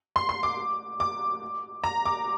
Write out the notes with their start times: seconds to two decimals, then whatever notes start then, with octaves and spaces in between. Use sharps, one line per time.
0.16 C6
0.29 C6
0.43 D6
1.00 D6
1.84 A#5
2.06 D6